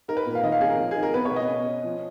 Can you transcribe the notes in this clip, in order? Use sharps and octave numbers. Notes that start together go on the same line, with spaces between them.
D#4 A#4
B4
A#2
F5
D#3 D#5
F5
C#4 G#4
A#4
F3
D#4 G#4
A#4
B3 B4
C#5
B2
D#5
C#4
C#4
F3